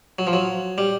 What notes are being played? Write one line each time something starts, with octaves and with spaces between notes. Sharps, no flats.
F#3
F3
F#3
G3